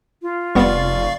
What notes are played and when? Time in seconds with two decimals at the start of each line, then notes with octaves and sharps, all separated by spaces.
0.22 F4
0.55 F1 G3 B3 D5 F5 C#6